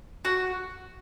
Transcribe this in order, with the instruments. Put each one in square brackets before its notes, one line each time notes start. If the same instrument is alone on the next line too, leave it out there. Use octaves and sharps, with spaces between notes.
[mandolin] F#4